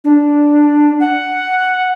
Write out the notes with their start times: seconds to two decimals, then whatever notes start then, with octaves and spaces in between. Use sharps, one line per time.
0.04 D4
1.00 F#5